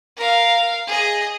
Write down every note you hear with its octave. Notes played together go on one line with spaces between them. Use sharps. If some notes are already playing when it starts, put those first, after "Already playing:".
A#4 F5
G#4 D#5